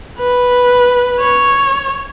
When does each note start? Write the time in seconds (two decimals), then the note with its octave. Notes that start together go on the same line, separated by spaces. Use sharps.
0.19 B4
1.20 C#5